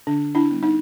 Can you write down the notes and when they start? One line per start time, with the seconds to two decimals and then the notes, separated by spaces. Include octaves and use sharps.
0.07 D3 D4
0.35 D4 E4
0.49 G3 B3 D4
0.63 D#4